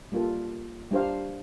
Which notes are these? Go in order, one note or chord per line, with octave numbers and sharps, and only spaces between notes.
G3 A#3 F4 A4
G3 D4 G4 C5 F5